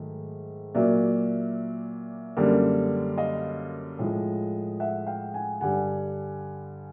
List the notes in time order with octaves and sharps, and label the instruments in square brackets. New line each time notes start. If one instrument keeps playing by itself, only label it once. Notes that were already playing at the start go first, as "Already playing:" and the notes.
Already playing: [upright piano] G#2 D#3 F#3 A3
A#2 F#3 A#3 D5 E5
F#2 D3 G3 A#3
D#5 F5
A2 F3 G#3
E5 F#5
F5 G5
F#5 G#5
G2 D3 G3 F#5 G#5